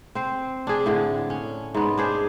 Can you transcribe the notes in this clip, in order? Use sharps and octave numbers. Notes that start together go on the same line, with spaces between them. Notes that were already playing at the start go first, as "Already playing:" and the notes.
C4 C5
D4 G#4
A2 D3
C#4
G#2 B3
D4 G#4 C5